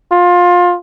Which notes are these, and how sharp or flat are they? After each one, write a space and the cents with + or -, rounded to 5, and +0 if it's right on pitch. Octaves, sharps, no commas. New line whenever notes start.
F4 +20